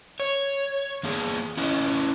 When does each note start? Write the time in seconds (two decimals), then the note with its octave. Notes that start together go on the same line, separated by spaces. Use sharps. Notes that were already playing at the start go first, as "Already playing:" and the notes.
0.20 C#5
1.03 E2 A#3 G#4
1.57 C#4 E4 B4 D#5